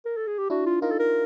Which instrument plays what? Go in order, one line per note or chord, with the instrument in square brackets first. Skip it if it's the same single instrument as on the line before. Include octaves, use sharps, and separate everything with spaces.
[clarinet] A#4
A4
G#4
G4
[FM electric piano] D4 E4 [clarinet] F#4
[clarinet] F4
[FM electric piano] D#4 F4 [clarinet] A#4
[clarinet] A4
A#4